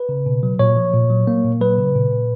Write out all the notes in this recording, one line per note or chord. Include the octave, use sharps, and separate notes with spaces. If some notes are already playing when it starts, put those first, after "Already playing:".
Already playing: B4
C#3
B2
F#3
A#2 C#5
F3
A#2
F#3
A#3
A#2
F#3 B4
C#3
A#2
A#2